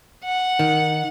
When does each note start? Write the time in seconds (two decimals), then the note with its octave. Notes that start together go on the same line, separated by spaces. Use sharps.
0.24 F#5
0.59 D#3